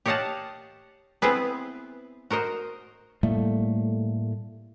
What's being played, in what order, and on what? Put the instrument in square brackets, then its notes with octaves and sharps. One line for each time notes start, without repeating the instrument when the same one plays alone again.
[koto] G4 C#5 D#5 F5 F#5 A5
B3 C4 E4 G#4 B4
F#4 A#4 C5 D#5
[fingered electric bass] A2 G3 A3 A#3